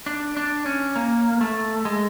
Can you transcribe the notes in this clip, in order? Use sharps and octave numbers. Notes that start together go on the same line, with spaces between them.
D4
D4
C#4
A#3
A3
G#3